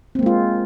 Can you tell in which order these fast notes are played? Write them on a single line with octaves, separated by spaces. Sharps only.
C4 A#3 G#3 F4